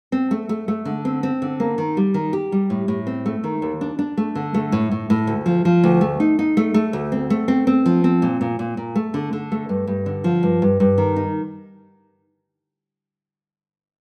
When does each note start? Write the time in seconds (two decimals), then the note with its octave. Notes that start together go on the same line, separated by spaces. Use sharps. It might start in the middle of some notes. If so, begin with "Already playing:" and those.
0.12 C4
0.31 A3
0.49 A3
0.68 A3
0.85 D3
1.05 C4
1.23 C4
1.42 D3
1.60 A#3
1.78 D#3
1.97 G3
2.14 D#3
2.33 G4
2.52 G3
2.70 A2
2.88 A2
3.07 C4
3.26 A3
3.44 D#3
3.62 D#2
3.81 D4
3.99 D4
4.17 A3
4.35 D3
4.54 A3
4.72 A2
4.91 A2
5.10 A2
5.27 D2
5.46 F3
5.65 F3
5.84 D2
6.01 A3
6.20 D#4
6.39 D#4
6.57 A3
6.74 A3
6.93 D2
7.12 C4
7.30 A3
7.48 C4
7.67 C4
7.86 F3
8.04 C4
8.22 A#2
8.41 A#2
8.59 A#2
8.77 A#2
8.95 A3
9.14 D3
9.33 D3
9.52 A3
9.69 G2
9.87 G2
10.06 D3
10.24 F3
10.43 G2
10.62 G2
10.80 G2
10.98 D#3
11.16 D#4